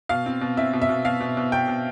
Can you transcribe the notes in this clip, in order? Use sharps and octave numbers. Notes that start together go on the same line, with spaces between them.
B2 F5
C4
B2
C4 E5
B2
E5
B2
B2 F5
B2
B2
B2 G5
B2